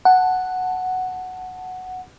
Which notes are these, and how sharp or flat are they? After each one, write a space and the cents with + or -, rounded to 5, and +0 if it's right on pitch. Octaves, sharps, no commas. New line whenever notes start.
F#5 +0 A5 +0